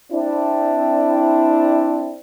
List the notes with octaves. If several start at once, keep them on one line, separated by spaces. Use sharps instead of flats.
C4 D4 E4